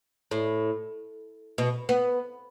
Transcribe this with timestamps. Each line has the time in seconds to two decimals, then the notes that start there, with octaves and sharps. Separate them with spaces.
0.31 A2
1.58 B2
1.89 B3